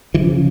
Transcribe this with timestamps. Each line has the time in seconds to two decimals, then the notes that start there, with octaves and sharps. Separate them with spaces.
0.14 E3
0.19 F3
0.23 C#3